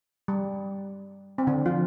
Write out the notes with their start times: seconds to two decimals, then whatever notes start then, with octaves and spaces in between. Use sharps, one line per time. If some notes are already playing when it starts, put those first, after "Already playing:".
0.28 G3
1.38 C4
1.47 D3 D4
1.66 F3 F4